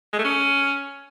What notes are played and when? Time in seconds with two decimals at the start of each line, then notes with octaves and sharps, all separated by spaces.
0.13 G#3
0.19 A3
0.25 C#4